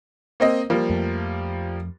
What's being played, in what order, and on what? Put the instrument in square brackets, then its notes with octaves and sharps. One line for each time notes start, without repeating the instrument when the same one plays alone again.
[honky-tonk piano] A#3 C4 D#5
F3 G3 A#3
[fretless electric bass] F2 A3